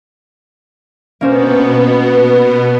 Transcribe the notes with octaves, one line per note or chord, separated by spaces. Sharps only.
B2 A#3 B3 C#4 C5